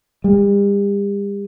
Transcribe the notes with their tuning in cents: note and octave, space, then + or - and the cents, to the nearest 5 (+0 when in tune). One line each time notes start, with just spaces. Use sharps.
G3 +40